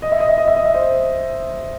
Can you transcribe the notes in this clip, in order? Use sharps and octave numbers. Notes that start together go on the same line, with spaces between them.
D#5
E5
D#5
E5
D#5
E5
D#5
E5
C5 D#5